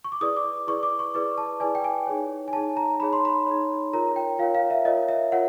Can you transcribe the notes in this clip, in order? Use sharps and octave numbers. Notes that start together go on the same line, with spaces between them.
C#6
D6
E4 G#4 B4 D5 D#6
D6
E4 G#4 B4 D5 C#6
D6
C#6
E4 G#4 B4 D5 D6
A5
E4 G#4 B4 D5 G#5
G5
G#5
D#4 G#4 C#5
G#5
D#4 G#4 C#5 A5
A#5
D#4 G#4 C#5 B5
C6
B5
D#4 G#4 C#5
F4 A#4 C#5 A#5
G5
F4 A#4 C#5 F5
F5
E5
F4 A#4 C#5 D#5
E5
F4 A#4 C#5 F#5